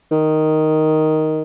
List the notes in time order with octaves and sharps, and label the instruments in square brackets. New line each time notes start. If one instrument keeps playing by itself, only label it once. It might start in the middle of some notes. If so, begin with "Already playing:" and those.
[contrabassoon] D#3